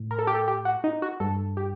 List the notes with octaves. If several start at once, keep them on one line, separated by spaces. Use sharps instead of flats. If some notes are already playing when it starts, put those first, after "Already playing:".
Already playing: A2
A#4
A4
G4
A4
G4
F#4
D#4
F#4
G2 A4
G4